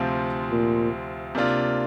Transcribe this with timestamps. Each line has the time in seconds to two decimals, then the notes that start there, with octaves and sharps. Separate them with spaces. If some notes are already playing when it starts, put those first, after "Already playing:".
Already playing: D2 C3 F3 C4 F4
0.52 A#2
1.35 C3 A#3 D4 F4